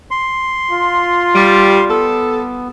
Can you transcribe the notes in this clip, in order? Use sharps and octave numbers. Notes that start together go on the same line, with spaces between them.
C6
F4
G3
B3 A4